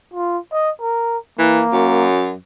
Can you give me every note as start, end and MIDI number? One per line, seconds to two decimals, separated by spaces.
0.14 0.38 65
0.52 0.70 75
0.81 1.18 70
1.39 1.61 52
1.39 2.06 58
1.73 2.34 42